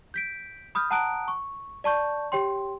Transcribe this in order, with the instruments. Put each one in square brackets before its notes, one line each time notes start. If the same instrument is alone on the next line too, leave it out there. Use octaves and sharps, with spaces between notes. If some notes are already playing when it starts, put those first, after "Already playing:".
[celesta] G6 B6 D7
B5 D#6 F6 G6
F#5 A5 A#5 D#6 F#6 D7
C#6
D5 A5 C#6 G6
G4 C#5 G5 C6